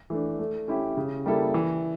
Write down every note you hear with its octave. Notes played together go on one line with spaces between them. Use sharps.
E3 A3 D4
A3
C#4 E4 G4
C#3
G3 A#3 E4 A4
E3